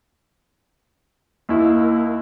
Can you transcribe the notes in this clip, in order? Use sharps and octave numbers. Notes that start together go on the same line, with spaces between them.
D#2 A#3 E4